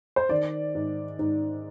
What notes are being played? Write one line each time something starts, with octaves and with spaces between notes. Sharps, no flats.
C5
D#3 D5
G#2
G#2